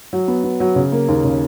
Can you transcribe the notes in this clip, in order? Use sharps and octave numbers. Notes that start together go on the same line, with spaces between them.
F#3
B3
B3
F#3
C#3
A#3
D#2
C#3